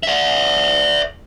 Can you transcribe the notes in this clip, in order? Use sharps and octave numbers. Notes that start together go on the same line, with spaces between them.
D5 E5